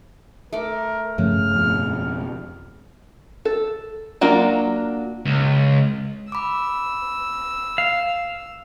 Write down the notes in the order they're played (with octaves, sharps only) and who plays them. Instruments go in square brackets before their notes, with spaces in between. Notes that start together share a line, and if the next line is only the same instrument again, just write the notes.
[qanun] A3 D6 [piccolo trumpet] A#4
[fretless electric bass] G2 F3 A3 [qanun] C#3 [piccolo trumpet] F6
[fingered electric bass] F2 B2
[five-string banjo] A4
F#3 A#3 D4 F4
[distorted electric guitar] C#2
[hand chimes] B5 D6 [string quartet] E6
[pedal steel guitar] F5